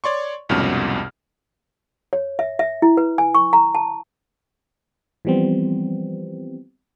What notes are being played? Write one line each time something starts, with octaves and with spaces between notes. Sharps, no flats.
C#5 D5 C6 C#6
C2 F2 G#2 B2 C#4 F6
C#5
E5
E5
E4
B4
G#5
C#6
A#5
A5
E3 F3 G3 B3 C4